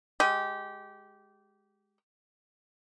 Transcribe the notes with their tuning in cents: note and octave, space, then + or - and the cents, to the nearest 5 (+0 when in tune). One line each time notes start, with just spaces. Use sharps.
G#3 +0 G4 -20